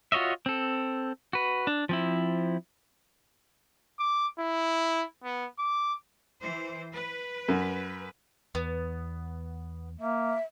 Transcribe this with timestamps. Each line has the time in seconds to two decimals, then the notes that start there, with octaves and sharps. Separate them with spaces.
0.12 F4 F#4 C#5 D#5 E5
0.46 C4 A4
1.33 F#4 B4
1.67 D4
1.89 F3 C4 E4
3.99 D6
4.39 E4
5.24 B3
5.59 D6
6.42 E3 C5
6.94 B4
7.48 F#2
8.55 E2 B3
10.00 A#3 E5